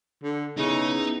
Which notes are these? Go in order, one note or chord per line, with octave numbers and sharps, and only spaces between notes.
D3
C#3 B3 D#4 E4